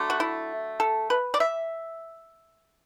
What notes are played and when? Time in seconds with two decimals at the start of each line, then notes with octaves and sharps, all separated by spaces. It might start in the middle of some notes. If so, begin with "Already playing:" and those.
Already playing: D3 F#3 A3
0.10 F#4
0.20 E4
0.80 A4
1.10 B4
1.34 D5
1.40 E5